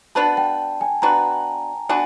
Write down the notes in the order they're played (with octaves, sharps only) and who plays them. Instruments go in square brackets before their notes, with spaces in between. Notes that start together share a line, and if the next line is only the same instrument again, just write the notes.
[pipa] B3 D4 F#4 B4 [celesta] A5
[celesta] G5
G#5
[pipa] B3 D4 F#4 B4 [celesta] A#5
[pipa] B3 D4 F#4 B4 [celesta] G#5